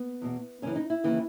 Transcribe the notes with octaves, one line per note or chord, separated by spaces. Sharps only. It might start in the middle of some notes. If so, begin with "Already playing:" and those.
Already playing: B3
E2 B2
F#2 C#3 E3 C#4
D#4
E4
D#2 C#3 E3